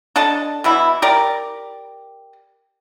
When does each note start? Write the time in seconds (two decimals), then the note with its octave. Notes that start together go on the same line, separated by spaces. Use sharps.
0.16 D4 A4 D#5 A5
0.64 B2 E3 E4
1.02 G4 A#4 D5